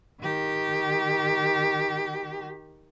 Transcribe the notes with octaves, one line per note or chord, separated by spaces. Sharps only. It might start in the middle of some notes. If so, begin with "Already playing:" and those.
D#3 G4